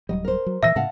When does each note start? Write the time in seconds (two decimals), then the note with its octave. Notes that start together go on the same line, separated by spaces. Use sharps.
0.09 D1 F#3 G3 D#5
0.24 A#4 C5
0.46 F#3
0.63 A#2 E3 E5 E6 A#6
0.76 A2 C#3 F5 F#5 A5